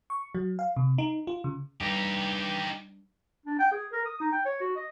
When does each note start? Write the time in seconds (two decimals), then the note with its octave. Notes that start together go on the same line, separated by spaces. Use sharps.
0.10 C#6
0.35 F#3
0.59 F5
0.77 C3
0.98 D#4
1.27 F4
1.44 C#3
1.81 G2 D#4 G4
3.46 D4
3.59 G5
3.72 G#4
3.92 A#4
4.06 D#6
4.20 D#4
4.32 G5
4.45 C#5
4.61 F#4
4.76 D#5